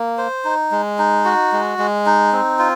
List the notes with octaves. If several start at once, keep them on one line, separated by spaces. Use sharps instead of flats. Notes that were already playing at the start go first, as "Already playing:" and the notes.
Already playing: A#3
C5
D#4
G#3
D#4
F#4
G#3
G#3
D#4
C4
F4